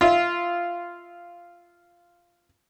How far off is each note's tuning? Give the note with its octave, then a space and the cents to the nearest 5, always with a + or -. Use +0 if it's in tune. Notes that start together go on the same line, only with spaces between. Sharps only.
F4 -10 E5 -15